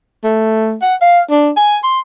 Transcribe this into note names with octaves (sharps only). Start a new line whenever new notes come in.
A3
F#5
F5
D4
G#5
C6